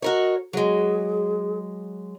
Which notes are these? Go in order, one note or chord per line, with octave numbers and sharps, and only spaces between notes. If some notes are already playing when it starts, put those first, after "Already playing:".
F#4 A#4 C#5 D#5
F#3 G#3 G#4